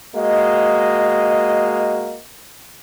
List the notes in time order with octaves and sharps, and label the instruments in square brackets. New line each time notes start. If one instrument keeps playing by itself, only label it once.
[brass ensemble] G#3 A#3 F#4 D#5